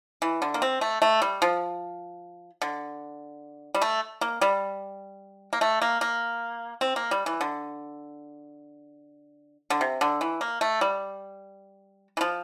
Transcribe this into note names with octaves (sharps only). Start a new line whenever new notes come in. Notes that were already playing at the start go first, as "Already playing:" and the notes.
E3
D3
A#3
C4
A3
A3
G3
F3
D3
G3
A3
A#3
G3
A#3
A3
A#3
A#3
C4
A#3
G3
E3
D3
D3
C3
D3
E3
A#3
A3
G3
E3
F3